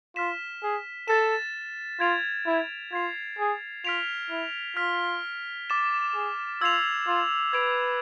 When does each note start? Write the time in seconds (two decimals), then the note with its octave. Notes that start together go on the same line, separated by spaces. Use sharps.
0.16 F4 F6 B6 E7
0.63 G#4
1.08 A4 A6 E7
2.00 F4 G#6 D7 F7
2.46 E4
2.92 F4 G#6 C7 F7
3.39 G#4
3.85 F4 F6 B6 D7 F7
4.30 E4
4.76 F4 F6 B6 F7
5.70 D6 A6 E7
6.15 G#4
6.61 F4 E6 G#6 C7 F7
7.07 F4
7.53 B4 D6 G#6 D7 F7